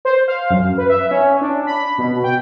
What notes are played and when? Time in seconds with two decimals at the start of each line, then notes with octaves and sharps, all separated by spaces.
0.05 C5
0.28 F5
0.50 F#2
0.78 B4
0.90 E5
1.11 C#4
1.41 D4
1.67 B5
1.98 B2
2.24 G5